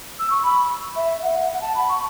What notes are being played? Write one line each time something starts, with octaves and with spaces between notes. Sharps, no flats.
E6
C#6
B5
E5
F#5
F#5
A5
B5
C#6